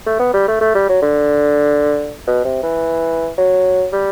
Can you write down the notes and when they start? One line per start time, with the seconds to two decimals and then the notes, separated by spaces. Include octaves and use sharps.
0.06 A3
0.19 B3
0.33 G3
0.48 A3
0.61 A3
0.75 G3
0.89 F#3
1.02 D3
2.27 B2
2.45 C3
2.63 E3
3.37 F#3
3.92 G3